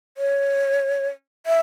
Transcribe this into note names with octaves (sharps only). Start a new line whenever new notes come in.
C#5
E5